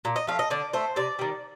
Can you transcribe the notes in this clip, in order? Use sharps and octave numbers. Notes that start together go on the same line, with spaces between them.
A#2
D#5
F3 A3 F5
D#5
D3 D5
A3 C5
C3 D5
D#3 G3